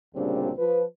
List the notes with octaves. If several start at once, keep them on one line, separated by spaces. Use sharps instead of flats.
D2 A#2 C#3 G3 C4 D4
F3 B4